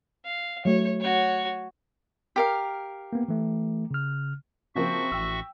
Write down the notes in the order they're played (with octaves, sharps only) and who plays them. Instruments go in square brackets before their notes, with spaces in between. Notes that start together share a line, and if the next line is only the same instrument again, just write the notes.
[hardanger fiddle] F5
[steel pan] F#3 A3 [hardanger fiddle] C#5
[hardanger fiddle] F#4 C#5
[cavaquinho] G4 A#4 F5
[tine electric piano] A#3 B3
E3 A3
C#3 F6
[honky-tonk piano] C#3 F3 A#3 [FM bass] C4 [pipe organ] F#4 E5 C#6
[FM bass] A1 [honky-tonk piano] G5 E6